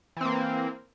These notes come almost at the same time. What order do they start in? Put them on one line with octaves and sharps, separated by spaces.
E3 C4 A#3